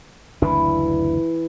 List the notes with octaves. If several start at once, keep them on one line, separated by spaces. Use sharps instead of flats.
F#1 D2 E3 D4